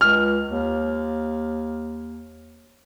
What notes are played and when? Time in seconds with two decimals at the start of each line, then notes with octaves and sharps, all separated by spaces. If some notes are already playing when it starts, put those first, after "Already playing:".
0.01 C#2 F6
0.49 D#2